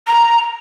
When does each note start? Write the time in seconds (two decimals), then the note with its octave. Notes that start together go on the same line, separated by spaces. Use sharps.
0.07 A#5